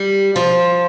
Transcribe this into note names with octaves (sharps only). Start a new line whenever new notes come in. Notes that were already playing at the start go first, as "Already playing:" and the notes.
Already playing: G3
F3